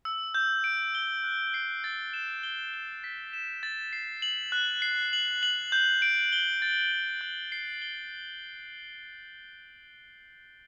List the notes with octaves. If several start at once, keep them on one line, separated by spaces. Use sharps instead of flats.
E6
G6
D7
G7
F#6
C7
A6
E7
G7
G7
B6
E7
A6
C7
F#7
F#6
C7
F#7
F#7
G6
D7
G7
A6
D7
G6
C7
G7